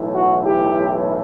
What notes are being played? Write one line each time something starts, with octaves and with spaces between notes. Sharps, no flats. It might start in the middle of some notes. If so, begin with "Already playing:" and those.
Already playing: B1 A2 E3
F#4
G4